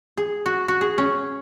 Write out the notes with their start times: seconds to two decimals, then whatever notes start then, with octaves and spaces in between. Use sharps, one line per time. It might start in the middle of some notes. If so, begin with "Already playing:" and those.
0.17 G#4
0.46 F#4
0.68 F#4
0.81 G#4
0.98 C#4